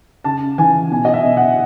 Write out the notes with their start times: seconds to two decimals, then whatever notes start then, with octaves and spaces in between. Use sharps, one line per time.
0.24 C#3 A5
0.58 E3 G#5
0.91 B2 G#5
1.05 D#5
1.14 E5
1.24 B2
1.37 F#5